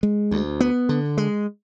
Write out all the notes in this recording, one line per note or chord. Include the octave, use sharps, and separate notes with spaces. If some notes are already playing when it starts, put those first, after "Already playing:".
G#3
D2
B3
D3
G#3